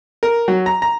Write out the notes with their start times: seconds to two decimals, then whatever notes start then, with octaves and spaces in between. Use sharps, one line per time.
0.23 A#4
0.48 F#3
0.66 A#5
0.82 A#5